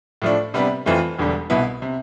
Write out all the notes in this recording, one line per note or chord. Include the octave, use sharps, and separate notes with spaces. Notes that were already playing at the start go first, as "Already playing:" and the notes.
A2 F3 A3 D4
C3 G3 B3 D4
F2 E3 A3 C4 F4
E1 E2 D3 G3
C2 B2 B3 E4
C3